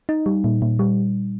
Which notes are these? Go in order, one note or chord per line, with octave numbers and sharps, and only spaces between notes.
D#4
G3
A#2
A#2
G3